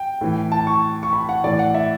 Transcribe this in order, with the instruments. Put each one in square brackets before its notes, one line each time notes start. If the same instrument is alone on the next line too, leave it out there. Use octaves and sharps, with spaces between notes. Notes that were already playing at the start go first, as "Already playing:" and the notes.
Already playing: [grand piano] G5
A2 E3
A5
C#6
C#6
B5
F#5
A2 E3 D5
F#5
E5